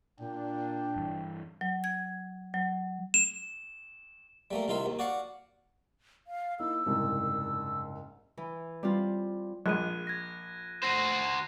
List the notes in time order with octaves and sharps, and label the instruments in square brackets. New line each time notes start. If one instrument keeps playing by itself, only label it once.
[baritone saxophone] A#2 [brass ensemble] D4 [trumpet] G5
[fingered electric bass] G2 E3
[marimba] F#3
G#6
F#3
[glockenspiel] E7
[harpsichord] G3 A3 A#3
C2 D#3 F4 E5 F5
D#2
F#4 D5 F5 F#5
[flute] F5
[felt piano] A#3 D#4 E4 [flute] E6
[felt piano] F#1 C2 G#2
[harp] E3
G3 C4 F4
[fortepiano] A#1 G#3 [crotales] F#6 D#7
[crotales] G#6 A#6
[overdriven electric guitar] F#4 C5 [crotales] A#6 C7 D#7